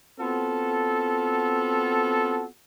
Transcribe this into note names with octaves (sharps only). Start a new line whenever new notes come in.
B3 C4 F4 F#4 A4